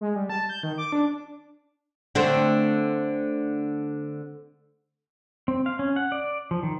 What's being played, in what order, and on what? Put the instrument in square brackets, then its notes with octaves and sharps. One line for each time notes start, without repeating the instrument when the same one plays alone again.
[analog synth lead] G#3
G3
A5
G6
D#3
D6
D4
[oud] D3 A3 C4
[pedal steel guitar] C4
F5
C#4
F#5
D5
F3
D#3